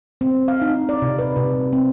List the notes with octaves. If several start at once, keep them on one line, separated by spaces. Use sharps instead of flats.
C4
F5
D#4
D5
C3
B4
C3
C4